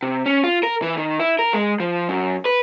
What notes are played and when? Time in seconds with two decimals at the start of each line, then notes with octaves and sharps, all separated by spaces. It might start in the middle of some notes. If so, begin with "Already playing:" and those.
0.03 C3
0.26 C#4
0.44 F4
0.63 A#4
0.82 E3
0.97 D#3
1.20 E4
1.39 A#4
1.53 G#3
1.80 F3
2.09 F#2
2.45 B4